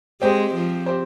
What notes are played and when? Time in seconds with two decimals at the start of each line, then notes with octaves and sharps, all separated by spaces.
0.21 G#3 C4 G4 C5
0.54 F3
0.86 C4 G4 C5